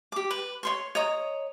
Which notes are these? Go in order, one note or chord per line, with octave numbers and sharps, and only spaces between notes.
G4 D6
B4
C#5 C6 C#6
C#5 D#5 A#5